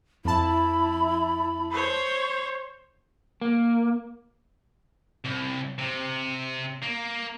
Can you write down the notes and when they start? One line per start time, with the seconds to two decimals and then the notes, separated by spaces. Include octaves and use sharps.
0.25 F2 E4 A5 B5
1.72 C5 C#5
3.41 A#3
5.25 C2
5.79 C3
6.83 A#3